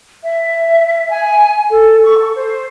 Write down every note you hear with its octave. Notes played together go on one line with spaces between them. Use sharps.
E5
G#5
A4
C#6
A4
C5